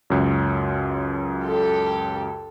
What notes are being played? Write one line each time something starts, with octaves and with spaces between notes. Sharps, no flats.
C#2 F#2
G4 A4